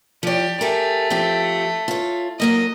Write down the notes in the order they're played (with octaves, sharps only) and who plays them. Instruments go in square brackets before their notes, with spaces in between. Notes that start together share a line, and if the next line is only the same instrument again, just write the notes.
[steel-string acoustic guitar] F3 C#5 [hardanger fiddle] G4 D5
[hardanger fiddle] A3 [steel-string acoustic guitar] G4 G#4 A#4
[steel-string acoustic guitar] F3 C4 G4
F4 C#5
[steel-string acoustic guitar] F#3 A#3 C#4 [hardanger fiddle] D#5